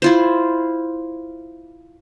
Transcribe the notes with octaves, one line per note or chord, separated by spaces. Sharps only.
E4 F4 C5